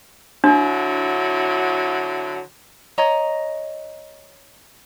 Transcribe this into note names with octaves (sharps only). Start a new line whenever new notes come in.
D3 F#3 D4 E4
C#5 D#5 A#5